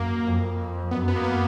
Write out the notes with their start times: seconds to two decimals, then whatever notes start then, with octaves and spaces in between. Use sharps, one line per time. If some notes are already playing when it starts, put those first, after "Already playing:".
Already playing: F#2 A#3
0.26 F2
0.91 F#2 B3
1.08 B3
1.16 A#3
1.24 B3